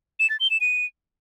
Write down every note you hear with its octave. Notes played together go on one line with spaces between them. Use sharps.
E7
A6
G7
E7
D#7